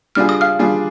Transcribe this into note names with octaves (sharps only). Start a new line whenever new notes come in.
G3 D4 F4 G#4 F6
D#6
F5 F6
G3 D4 F4 G#4